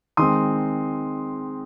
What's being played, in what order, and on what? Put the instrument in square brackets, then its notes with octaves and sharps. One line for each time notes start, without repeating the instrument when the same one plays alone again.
[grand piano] D#3 G#3 C4 C6 D#6